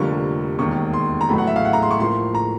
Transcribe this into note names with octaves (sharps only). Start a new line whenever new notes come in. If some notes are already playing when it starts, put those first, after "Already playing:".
Already playing: F1 F2 D3 G3 A#3 C#6
E1 D#2 D#3 C#6
C6
A#5
A1 A2 F#3 A3 B5
F#5
E5
F5
F#5
A#5
C6
C#6
A2 F3 A#3 C6
A#5